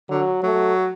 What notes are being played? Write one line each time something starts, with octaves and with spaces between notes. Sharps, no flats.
D3 F#3
F#3 A3